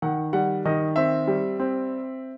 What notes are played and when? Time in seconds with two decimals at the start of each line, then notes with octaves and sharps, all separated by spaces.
0.02 D#3 F#5
0.33 G3 F#5
0.65 D#3 D#5
0.96 C4 E5
1.27 G3
1.59 C4